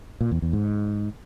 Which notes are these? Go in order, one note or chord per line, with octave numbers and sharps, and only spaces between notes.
A#2
E2
E2
G#2